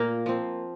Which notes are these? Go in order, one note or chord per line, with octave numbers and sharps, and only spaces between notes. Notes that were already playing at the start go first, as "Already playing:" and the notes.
Already playing: A#2 A#3 A#4
F3 C4